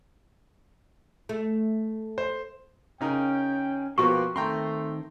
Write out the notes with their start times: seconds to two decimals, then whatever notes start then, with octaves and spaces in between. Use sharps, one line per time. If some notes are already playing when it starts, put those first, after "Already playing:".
1.29 A3
2.18 C5
3.01 C#3 C#4 D#4 A#4 G5
3.98 B2 F3 A#3 F#4 B4 G5 C6 C#6
4.36 D#3 A3 C4 G5 A#5 C6